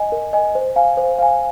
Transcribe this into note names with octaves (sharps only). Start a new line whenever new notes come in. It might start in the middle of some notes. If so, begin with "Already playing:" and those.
Already playing: D#5 G#5
A#4
D#5 G#5
C5
F5 G#5
C5
F5 G#5